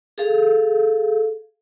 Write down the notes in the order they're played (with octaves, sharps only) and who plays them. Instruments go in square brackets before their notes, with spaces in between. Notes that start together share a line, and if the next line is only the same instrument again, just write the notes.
[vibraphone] G#4 A4 F5